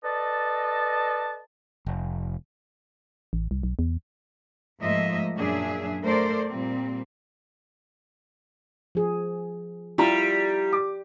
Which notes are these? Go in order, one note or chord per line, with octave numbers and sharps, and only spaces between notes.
A4 B4 D5 D#5 A5
F1
A1
C2
B1
E2
G#2 F3 A3 A#3 D#5 E5
F#2 A#2 D4 G#4 E5
A3 A4 A#4 C5 D5
A#2 G3 C4
F3 G#4
G3 E4 F4 A#5
D6